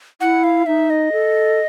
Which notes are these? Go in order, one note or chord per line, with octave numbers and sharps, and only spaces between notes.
E4 F#5
F5
D#4 E5
D#5
A4